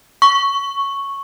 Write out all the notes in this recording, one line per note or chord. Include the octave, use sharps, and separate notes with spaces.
C#6